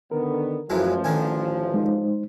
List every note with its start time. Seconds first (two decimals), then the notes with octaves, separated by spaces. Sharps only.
0.11 D3 D#3 B3 A#4
0.70 A1 F#2 E3 F3 G#3
1.04 D3 D#3 G#5
1.74 G#3 D#4 C5